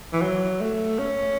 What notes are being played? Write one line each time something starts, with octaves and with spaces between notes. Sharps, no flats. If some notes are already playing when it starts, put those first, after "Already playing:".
E3
F#3
A3
C#4